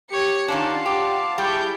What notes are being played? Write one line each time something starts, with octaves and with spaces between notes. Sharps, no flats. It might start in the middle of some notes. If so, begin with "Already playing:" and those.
G4 C#5 C#7
D#3 C#4 D4 F4 D5 F#5 A5
G4
G3 E4 G4 G#4 G5 A5 C#6 G6